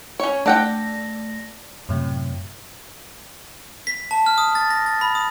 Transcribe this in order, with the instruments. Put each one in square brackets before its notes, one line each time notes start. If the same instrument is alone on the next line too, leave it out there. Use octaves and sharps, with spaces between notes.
[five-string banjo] C#4 C#5
[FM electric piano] A3 D5 A#6 [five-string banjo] D4 F#5 G5
[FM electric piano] F#2 A2 C3
[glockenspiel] B6
A5
F6
D#6
A6
A#6
A6
B5
D#6